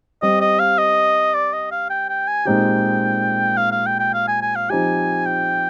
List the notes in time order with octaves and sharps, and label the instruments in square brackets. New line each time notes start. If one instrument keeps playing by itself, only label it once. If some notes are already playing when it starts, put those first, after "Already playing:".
[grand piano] G3 C4 G4 [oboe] D#5
[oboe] D#5
F5
D#5
D5
D#5
F5
G5
G5
G#5
[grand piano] A#2 G#3 C4 D#4 G4 [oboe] G5
[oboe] F5
F5
G5
G5
F5
G#5
G#5
F5
[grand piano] F3 C4 D#4 G4 [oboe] G#5
[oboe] G5